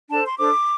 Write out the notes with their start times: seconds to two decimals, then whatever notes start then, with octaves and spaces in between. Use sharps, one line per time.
0.10 D4 A4 C5 A5
0.25 C6
0.38 D4 A4 C5 D6